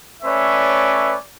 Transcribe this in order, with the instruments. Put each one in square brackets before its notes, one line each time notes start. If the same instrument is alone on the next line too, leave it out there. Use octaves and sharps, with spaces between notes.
[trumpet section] A3 C#4 B4 C#5 D5 E5